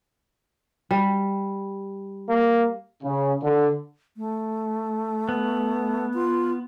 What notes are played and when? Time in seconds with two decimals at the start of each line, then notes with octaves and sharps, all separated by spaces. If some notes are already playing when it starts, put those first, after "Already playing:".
0.91 G3
2.29 A#3
3.03 C#3
3.43 D3
4.17 A3
5.29 B3
6.14 F4